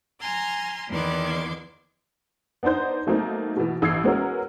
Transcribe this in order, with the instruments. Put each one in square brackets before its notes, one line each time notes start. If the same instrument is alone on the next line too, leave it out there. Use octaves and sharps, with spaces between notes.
[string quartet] G#5 A#5 C6 F6
E2 D#3 B3 C6 D6 G#6
[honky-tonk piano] B3 D4 D#4 C5 G6
F#3 A3 A#3 C4 D#4
B2 E3
A1 E6 G#6 C7
G#3 B3 C#4 F#4 A#4